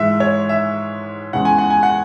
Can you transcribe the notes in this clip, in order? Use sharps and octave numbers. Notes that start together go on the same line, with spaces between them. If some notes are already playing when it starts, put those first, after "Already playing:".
Already playing: G#2 E3 G#3 E5
C#5
E5
E2 C#3 E3 G#3 F#5
G#5
F#5
G#5
F#5